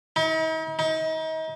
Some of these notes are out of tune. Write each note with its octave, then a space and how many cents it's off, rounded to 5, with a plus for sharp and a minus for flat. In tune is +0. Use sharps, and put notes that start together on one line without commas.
D#4 +45
D#4 +35